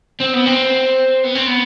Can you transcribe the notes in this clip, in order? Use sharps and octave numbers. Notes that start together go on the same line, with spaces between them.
C4
B3
C4
B3
C4
B3